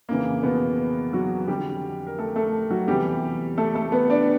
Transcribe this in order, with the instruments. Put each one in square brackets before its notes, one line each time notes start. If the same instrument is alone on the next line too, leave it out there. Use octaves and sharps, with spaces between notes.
[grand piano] F2 C#3 E3 A#3
B2 B3
F#3 F#4
F2 D3 G3 G4
A#4
A3 A4
A3 A4
F#3 F#4
E2 C3 E3 G3 G4
A3 A4
A3 A4
B3 B4
D4 D5